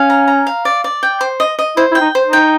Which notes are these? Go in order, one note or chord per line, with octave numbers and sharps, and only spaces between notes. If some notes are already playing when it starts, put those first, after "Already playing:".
Already playing: C#4 F5
A#5
A#5
F5
D5
D5
G5
C5
D#5
D#5
E4 C5
E4
G5
D#4
C5
D#4
G5